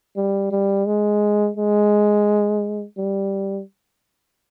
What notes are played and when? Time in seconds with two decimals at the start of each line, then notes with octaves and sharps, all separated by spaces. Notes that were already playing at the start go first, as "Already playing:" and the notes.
0.16 G3
0.51 G3
0.86 G#3
1.57 G#3
2.98 G3